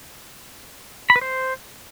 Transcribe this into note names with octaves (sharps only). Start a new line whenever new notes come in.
B5
B4
C5